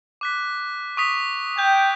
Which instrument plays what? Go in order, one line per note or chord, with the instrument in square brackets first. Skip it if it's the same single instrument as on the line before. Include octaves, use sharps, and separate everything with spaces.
[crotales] D6 F#6 B6
C#6 D#6 B6
[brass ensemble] G5 [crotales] G6 G#6